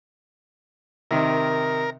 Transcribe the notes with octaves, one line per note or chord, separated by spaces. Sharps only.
C3 D#3 A#4